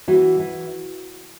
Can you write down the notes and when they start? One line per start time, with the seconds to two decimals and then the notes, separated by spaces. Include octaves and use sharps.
0.08 E3 F#4
0.39 E3